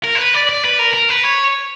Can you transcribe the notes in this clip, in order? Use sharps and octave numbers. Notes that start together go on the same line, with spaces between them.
A#4
C5
B4
D5
D5
B4
A#4
A#4
B4
C#5